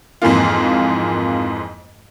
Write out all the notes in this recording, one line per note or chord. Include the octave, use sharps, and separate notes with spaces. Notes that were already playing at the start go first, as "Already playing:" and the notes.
F2 G#2 E3 A#3 F4